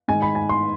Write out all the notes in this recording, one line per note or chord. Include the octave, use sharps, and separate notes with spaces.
G#2 D#3 G#5
B5
G#5
C6